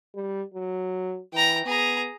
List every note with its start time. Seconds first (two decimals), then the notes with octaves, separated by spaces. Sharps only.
0.15 G3
0.54 F#3
1.33 E3 G5 A#5
1.65 B3 G#4 A#5